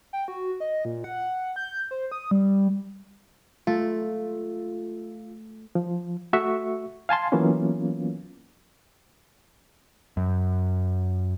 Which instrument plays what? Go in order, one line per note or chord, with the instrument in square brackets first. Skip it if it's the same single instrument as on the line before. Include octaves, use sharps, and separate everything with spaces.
[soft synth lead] G5
F#4
D#5
A#2
F#5
G6
C5
D#6
G3
[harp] A3 [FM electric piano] F4
[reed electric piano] F3
A3 F#4 E5 C#6
F5 G#5 A5 C6
E3 F#3 A#3 B3 C#4 F4
[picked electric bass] F#2